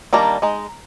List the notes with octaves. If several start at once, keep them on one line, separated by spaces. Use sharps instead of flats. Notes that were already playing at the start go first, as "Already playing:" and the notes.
D#3 G3 A#3 D4 A#5
G#3 D#4